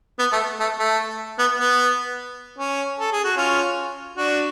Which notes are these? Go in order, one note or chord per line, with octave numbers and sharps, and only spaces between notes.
B3
A3
A3
A3
B3
B3
C#4
A4
G#4
F#4
C#4 F4
D4 F#4